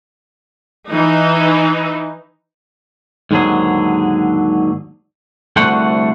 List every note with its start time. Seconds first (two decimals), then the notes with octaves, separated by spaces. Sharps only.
0.89 E3 D#4
3.31 D#2 G#2 D3 F#3 G#4
5.56 C2 D3 A3 F#4 C5 F#5